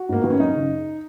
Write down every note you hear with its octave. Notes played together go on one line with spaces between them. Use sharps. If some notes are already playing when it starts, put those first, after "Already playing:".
Already playing: F#4
G#2 A#3
D#3 B3
C#4
F#2 D#4
C#3